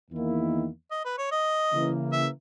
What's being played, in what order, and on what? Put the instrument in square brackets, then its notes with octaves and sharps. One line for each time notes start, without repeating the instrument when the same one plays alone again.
[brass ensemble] E2 D#3 A#3 E4
[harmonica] D#5
B4
C#5
D#5
[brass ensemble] C#3 E3 A#3
[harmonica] E5